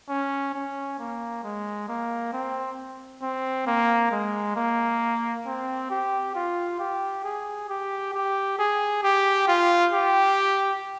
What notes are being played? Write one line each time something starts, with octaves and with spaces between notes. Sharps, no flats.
C#4
C#4
A#3
G#3
A#3
C4
C4
A#3
G#3
A#3
C4
G4
F4
G4
G#4
G4
G4
G#4
G4
F4
G4